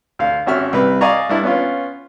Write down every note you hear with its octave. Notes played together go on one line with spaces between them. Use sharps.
D2 F5
G#1 C#4 F#4 E5 F6
C2 B4
D5 D#5 F5 G#5 A#5 C#6
G2 D4 E4
B3 C#4 F4